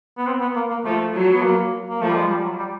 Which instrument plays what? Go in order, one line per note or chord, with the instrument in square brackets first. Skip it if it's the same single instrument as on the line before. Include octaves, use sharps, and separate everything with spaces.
[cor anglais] B3
C4
B3
A#3
A#3
[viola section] F3 [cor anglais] A3
[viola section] F#3
[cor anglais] B3
A#3
A#3
[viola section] F3 [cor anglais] A3
[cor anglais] G3
G#3
G3
F#3
G3